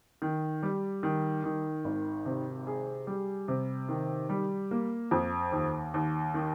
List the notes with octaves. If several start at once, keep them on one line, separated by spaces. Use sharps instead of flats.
D#3
G3
D#3
D#3
G#1
C3
G#4
G3
C3
D#3
G3
A#3
F2
D#2
D#2
D#3